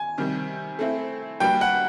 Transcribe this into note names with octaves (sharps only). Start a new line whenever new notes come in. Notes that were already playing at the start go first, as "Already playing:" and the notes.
Already playing: G#5
C3 D#3 G3
A3 C4 E4
G3 A#3 D4 F#4 B4 G5
F#5